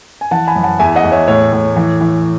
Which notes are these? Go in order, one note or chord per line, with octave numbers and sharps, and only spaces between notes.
G#5
E3 F#5 A5
G#5 B5
F#2
F#5 A5
E2 E5 G#5
D#5 F#5
E2
C#5 E5
A2 C#5
A2
E3
E3